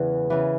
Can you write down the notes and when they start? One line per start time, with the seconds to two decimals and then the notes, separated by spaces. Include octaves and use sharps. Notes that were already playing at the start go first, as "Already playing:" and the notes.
Already playing: E2 C#3 E3
0.30 C#3 E3